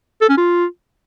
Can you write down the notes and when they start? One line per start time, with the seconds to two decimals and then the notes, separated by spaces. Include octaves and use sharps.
0.21 A4
0.29 C#4
0.38 F4